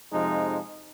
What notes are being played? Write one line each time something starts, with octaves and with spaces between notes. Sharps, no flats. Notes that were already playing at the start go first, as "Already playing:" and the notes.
F2 C3 F3 G#3 D#4